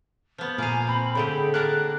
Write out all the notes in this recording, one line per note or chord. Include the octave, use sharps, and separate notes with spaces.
F3 B3
A#2 A#3 F5 G#5
C4 B5
A2 D3 G4 G#4
A#3 D4 A#4 F#6